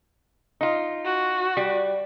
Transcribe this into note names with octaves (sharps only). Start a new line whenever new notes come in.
D#4 F4
F#4
G3